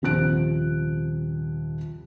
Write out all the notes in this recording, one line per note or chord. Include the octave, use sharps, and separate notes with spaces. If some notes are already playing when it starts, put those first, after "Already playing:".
D#1 C3 F3 F#6 D7